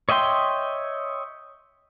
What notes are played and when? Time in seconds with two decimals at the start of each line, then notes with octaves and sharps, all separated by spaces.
0.09 C#5 D#5 E5 G5 C6